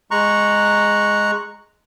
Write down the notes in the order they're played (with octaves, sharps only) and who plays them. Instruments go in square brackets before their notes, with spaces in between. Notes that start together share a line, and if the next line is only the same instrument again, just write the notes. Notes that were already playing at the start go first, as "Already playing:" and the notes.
[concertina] G#3 A#5 C#6 F#6